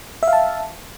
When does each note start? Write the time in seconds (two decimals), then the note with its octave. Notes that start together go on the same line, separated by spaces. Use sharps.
0.23 E5
0.28 F5
0.33 A5